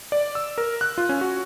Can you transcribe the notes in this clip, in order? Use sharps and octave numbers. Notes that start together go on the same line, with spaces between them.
D5
E6
A#4
F#6
F4
C#4
F#4